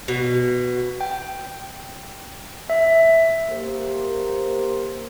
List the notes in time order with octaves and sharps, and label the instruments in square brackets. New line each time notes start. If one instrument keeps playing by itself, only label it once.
[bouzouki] B2
[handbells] G5
E5
[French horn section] A#3 G4 A#4 C5